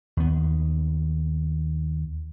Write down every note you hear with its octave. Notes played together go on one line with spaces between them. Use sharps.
D#2 B3